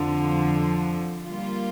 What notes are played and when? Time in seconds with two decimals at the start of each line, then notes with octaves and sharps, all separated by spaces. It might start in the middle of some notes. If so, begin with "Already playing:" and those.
Already playing: F2 D3 F3
1.26 G3 A#3 F4